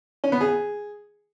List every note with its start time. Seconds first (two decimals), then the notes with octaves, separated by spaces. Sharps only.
0.24 C#4
0.32 B3
0.41 G#4